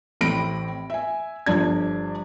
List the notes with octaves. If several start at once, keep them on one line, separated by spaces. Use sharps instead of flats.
A1 A2 C4 B5 A#6 D7
E5 G#5
G1 F3 D4 G#6